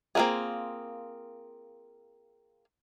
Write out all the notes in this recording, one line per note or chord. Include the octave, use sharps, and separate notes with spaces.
A#3 C4 E4 F4 G#4